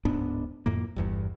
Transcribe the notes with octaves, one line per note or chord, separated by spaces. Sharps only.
D1 G#2 B3 D4
F2 A2 A#3
G1 E2 G2